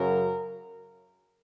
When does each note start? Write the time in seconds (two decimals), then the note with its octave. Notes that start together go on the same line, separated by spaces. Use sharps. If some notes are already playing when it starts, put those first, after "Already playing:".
Already playing: F#2 C#3 F#3 A#4